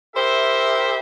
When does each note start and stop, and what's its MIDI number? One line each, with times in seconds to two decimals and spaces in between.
0.14 0.99 64
0.14 0.99 67
0.14 0.99 70
0.14 0.99 72
0.14 0.99 76